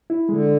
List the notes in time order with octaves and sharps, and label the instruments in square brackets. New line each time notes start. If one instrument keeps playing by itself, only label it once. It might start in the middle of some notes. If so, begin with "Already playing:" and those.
[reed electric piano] E4
[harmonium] D3 [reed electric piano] G#3